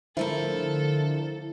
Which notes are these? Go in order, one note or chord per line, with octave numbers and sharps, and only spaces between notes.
D3 F3 A3 E4 A4 A#4